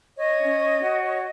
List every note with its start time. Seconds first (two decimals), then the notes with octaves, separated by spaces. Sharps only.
0.17 C#5 D#5
0.39 C#4
0.60 C#5
0.81 F#4
1.02 C#5